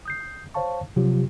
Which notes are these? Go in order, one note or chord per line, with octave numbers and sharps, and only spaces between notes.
D#6 G6 C7
C5 C#5 F5 A5 C#6
C3 F3 F#3 F4 G4